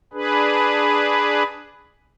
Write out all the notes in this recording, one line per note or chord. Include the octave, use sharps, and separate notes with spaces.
D4 G#4 B4